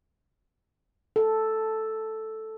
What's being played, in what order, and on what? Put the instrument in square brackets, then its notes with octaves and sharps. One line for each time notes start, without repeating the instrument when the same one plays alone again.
[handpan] A4